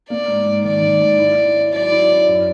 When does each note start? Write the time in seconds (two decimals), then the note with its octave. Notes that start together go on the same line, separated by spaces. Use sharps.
0.09 A#3 D5
0.28 G#2
0.46 G#2
0.64 D#3 D5
0.82 D#3
1.00 G#2
1.18 E4
1.37 E4
1.54 C#4
1.73 F#3 D5
1.91 E4
2.09 C#4
2.28 F#2